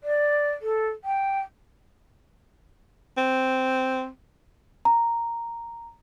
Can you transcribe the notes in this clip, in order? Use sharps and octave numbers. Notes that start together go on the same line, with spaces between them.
D5
A4
G5
C4
A#5